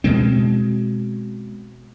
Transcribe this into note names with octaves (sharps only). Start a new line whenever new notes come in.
B2 G#3 C4